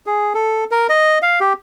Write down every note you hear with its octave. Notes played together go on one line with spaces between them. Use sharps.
G#4
A4
A#4
D#5
F5
G4